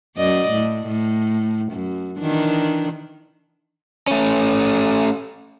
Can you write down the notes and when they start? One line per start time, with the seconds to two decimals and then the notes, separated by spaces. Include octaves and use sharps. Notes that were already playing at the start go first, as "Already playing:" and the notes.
0.17 F#2 D5 D#5
0.51 A2
0.87 A2
1.72 F#2
2.19 D#3 E3 D4
4.07 A3 C#4